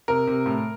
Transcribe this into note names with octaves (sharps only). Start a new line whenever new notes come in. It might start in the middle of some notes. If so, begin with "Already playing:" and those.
C3 A#4
C3
A2